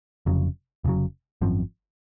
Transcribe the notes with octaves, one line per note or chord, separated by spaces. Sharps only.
F1 F2 C#3 F#3
F1 F2 C#3 F#3
G#1 F#2 F3 C4